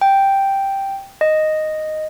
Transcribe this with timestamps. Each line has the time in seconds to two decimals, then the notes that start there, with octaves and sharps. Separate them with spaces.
0.01 G5
1.21 D#5